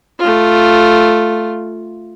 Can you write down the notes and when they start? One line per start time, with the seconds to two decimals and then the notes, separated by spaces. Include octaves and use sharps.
0.19 A3 F4